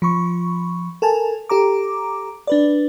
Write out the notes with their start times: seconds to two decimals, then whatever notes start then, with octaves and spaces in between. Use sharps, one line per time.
0.02 F3 B5 C#6
1.02 A4 A#4 G#5 A5
1.49 G4 A4 A#5 D6
2.47 D4 B4 D5